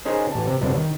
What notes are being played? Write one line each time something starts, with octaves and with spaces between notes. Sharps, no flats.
C#4 D#4 G#4 A#4 C5
A1 A5
C3
G1 C2 F2 C3 F#3 D4
D#3